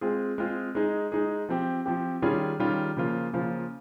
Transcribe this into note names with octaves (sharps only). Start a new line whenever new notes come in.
G#3 C4 F4 G#4
G#3 C4 F4 G#4
G#3 D#4 G#4
G#3 D#4 G#4
F3 C4 G4
F3 C4 G4
D#3 G3 C#4 F4 G#4
D#3 G3 C#4 F4 G#4
C#3 F3 A#3 F4
C#3 F3 A#3 F4